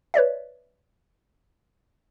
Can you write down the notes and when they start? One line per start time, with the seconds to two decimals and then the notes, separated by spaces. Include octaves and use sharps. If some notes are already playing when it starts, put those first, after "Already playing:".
0.14 B4 C#5 D5 E5